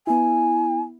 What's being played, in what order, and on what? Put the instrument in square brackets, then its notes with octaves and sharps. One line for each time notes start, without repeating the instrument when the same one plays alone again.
[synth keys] B3 E4 [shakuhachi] G#5